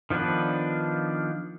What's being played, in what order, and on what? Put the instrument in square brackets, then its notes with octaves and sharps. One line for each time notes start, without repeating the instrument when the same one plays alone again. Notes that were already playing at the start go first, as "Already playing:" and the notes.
[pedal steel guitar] D#3 F3 B3 D4 B4